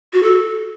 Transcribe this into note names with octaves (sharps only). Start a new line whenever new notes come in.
F#4
A4